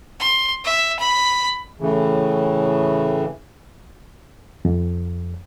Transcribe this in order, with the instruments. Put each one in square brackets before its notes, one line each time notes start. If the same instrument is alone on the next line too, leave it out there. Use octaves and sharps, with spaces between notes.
[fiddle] C6
E5
B5
[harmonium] A2 C#3 E3
[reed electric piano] F2